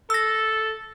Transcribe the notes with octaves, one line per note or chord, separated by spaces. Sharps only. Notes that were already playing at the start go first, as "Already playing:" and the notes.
A4 E6 A#6